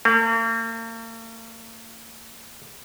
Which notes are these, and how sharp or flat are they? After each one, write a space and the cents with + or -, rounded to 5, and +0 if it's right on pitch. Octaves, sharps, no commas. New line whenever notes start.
A#3 -45